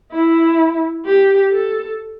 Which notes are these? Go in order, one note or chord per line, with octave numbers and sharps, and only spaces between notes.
E4
G4
A4